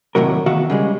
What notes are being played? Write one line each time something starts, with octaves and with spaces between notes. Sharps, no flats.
D#2 A2 C3 F#3 A#4
E2 D#3 F#4 E5 F5
C#3 G3 G#3